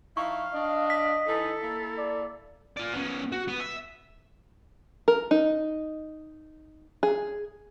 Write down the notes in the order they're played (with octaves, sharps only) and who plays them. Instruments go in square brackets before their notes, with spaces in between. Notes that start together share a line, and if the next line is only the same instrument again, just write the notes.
[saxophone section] F3 D#4 E4 [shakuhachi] F5 [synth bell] C#6
[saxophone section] D4 [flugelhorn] D#5
[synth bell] B6
[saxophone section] E3 D#4 [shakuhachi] A4
[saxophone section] A#3 E4
[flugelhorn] D5
[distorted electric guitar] F4 D5
B3 C#4
F#4
B3
E5
[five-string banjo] A#4
D#4
G#4